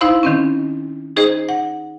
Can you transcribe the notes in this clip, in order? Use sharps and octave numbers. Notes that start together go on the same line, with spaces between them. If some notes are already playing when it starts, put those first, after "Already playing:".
D#4 E4 C5 F5 B5 C6
D#3 C4 C#4
D#4 G#4 C5 D#5
F#5